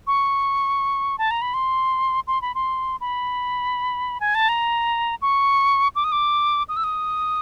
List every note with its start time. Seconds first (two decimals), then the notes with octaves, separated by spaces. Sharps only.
0.07 C#6
1.18 A5
1.31 A#5
1.42 B5
1.54 C6
2.27 C6
2.42 B5
2.55 C6
3.01 B5
4.20 G#5
4.35 A5
4.49 A#5
5.22 C#6
5.95 D6
6.04 D#6
6.12 D6
6.69 D#6
6.77 E6
6.84 D#6